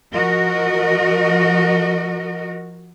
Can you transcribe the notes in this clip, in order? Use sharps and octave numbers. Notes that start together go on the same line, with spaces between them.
F3 F#4 A#4 D#5